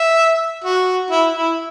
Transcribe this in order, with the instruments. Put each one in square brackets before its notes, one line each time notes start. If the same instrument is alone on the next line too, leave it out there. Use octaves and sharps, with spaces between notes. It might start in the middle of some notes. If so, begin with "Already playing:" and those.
Already playing: [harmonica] E5
F#4
E4
E4